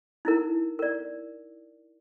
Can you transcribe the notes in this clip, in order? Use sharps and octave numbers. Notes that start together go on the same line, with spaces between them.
D#4 E4 A#4
A#4 D5